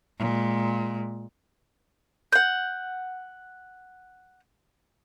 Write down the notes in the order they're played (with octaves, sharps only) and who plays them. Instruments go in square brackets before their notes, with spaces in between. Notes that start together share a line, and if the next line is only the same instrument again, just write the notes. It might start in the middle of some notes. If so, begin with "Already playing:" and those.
[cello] A#2 G#3
[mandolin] F#5 G6